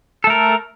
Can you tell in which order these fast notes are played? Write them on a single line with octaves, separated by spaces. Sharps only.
A4 A3 A#4